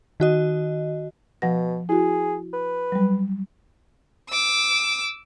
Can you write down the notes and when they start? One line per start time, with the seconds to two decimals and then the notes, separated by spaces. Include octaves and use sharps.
0.20 D#3 F#4 D#5
1.42 B2 F3 F#5 A#6
1.89 E4 F#4 G#4
2.53 B4
2.92 F#3 G3
4.30 D6 E6